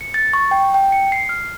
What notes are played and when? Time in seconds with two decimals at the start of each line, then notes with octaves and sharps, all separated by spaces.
0.01 C#7
0.14 A6
0.33 C#6
0.51 G5
0.74 G5
0.92 C#7
1.12 C7
1.29 F6